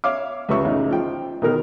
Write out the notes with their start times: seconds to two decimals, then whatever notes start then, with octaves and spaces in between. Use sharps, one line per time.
0.04 C#5 E5 F5 D6
0.49 C#2 G3 B4 E5 C#6
0.64 A1 C#3 D#4
0.91 F3 G5
1.42 B2 D#3 A#4